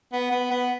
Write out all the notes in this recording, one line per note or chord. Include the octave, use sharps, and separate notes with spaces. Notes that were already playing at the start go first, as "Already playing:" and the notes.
B3
B3
B3